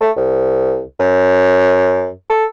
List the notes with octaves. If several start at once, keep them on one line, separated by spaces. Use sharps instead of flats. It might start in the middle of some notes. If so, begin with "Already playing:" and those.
A3
C2
F#2
A4